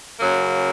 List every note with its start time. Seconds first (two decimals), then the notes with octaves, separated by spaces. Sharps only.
0.20 F#2 C#3 F#3 A#3